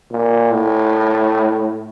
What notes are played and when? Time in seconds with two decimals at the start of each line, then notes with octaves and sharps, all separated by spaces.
0.11 A#2
0.52 A2